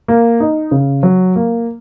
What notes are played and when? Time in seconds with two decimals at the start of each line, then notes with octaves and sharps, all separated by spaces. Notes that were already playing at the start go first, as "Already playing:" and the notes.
0.08 A#3
0.40 D#4
0.71 C#3
1.03 F#3
1.36 A#3